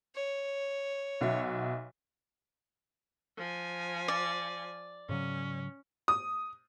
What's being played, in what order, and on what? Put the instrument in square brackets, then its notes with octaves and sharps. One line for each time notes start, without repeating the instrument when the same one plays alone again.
[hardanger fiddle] C#5
[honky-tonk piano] B1 F#4 E5
[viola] F3 G#5
[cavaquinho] D5
[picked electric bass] G#2 C#3 F#3 [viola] C#4
[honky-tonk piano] D#6